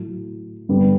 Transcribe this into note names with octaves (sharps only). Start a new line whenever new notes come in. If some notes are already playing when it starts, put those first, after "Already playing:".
Already playing: A2 F#3 A3
G2 D3 G3 B3